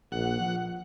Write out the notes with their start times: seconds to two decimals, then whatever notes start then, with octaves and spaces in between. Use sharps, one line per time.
0.12 A#1 F#5
0.41 F3